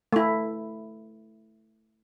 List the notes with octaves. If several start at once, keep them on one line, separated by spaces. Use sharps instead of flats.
A3 E4